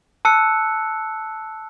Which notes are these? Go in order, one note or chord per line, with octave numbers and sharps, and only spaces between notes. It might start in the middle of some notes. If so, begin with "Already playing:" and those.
A5 E6 F#6 C#7